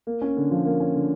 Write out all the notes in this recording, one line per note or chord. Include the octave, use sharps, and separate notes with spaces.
A#3
C#4
D3
F3
A#3
C#4
D3